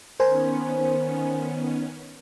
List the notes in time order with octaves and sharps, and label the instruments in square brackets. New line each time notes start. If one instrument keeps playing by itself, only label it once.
[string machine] D#3 B3 C#4 [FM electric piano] A#4 C5 G#5